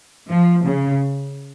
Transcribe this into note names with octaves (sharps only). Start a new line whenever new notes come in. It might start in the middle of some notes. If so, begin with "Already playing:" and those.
F3
C#3